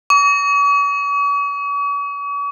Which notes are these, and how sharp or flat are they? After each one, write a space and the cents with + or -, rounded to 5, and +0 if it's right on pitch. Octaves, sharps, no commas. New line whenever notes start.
C#6 +45